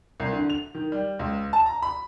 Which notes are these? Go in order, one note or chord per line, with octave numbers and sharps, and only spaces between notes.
C2
D3
F7
D#3
G3
C#2
A5
A#5
B5